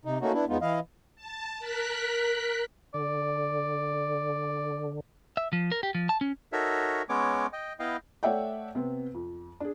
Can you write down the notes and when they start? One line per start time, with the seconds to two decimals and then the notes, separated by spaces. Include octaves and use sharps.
0.05 C3 D#4
0.21 A3 A#3 C#4 D#4 F#4
0.33 B3 D4 E4
0.49 E2 G#3 B3 D#4 F4
0.61 E3 E4 D#5 F5
1.16 A5
1.59 A#4 F#6 B6
2.94 D3 D5
5.37 E5
5.53 F3
5.72 A#4
5.83 G4
5.95 F3
6.09 A5
6.21 C#4
6.52 D#4 F#4 A4 A#4 C#5 E5
7.09 G#3 B3 C#4 C#5 D6
7.53 D#5 G5
7.79 B3 E4 D#5 F5 G5
8.23 A3 C#5 D5 E5 F#5 G5
8.75 C3 B3 C4
9.14 F2
9.60 D4 G#4